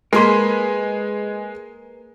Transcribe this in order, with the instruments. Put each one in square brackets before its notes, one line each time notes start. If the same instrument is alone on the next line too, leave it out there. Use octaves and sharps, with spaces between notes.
[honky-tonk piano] G#3 G#5 [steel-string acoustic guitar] A#3 G#4 B4 [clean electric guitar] A#4 C6